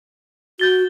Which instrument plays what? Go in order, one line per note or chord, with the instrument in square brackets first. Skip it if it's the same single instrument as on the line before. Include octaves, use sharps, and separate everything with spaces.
[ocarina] F#4 [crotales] G6 A6 G7